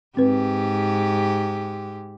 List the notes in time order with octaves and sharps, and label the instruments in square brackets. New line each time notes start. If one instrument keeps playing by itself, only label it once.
[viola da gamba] G#2 G4 [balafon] C4 B4